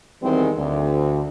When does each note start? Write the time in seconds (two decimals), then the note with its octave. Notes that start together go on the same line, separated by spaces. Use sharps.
0.22 E2 D#3 E3 G3 G#3 C4
0.57 D2